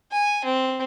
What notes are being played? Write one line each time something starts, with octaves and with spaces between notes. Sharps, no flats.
G#5
C4